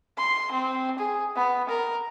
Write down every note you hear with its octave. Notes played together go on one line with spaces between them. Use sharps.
C6
C4
G#4
B3
A#4